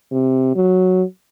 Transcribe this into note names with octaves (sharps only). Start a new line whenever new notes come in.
C3
F#3